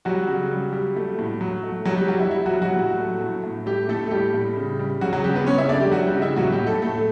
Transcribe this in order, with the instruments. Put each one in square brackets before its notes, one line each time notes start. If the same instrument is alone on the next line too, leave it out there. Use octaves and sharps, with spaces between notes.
[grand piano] F#3 G3 F#4
C#3
G3
G3
A3
A2
F#3
A3
F#3 G3 F#4
G3 G4
F#3 G3 F#4
E4
G3 E4
F#3 F#4
G3
F#3 F#4
A2
A3
A2
A2
G3 A3 G4
A2 A3 A4
A4
A2 G3 G4
A2
C#3
G3
C#3 F#3 F#4
F#3 F#4
C#3 G3 G4
B3 B4
C#3 C#4 C#5
E4 E5
A3 D4 D5
G3 G4
F#3 F#4
G3 G4
C#3
E4 E5
A2 F#3 F#4
G3 G4
A2
A3 A4
A2 A3 A4